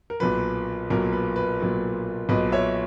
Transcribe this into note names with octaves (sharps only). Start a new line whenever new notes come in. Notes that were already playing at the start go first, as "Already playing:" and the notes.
A#4
B1 A#2 F#3 B4
B1 A#2 F#3 A#4
B4
B4
B1 A#2 F#3
B1 A#2 F#3 B4 D#5
C#5 E5